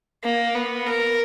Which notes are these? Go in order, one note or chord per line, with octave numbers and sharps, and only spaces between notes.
A#3
B3
A#4